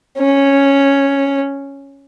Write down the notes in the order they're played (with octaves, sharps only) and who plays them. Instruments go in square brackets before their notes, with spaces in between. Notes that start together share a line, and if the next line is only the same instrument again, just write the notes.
[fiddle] C#4